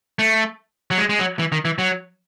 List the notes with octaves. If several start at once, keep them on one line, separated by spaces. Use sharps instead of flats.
A3
F#3
G#3
G#3
F#3
E3
D#3
E3
F#3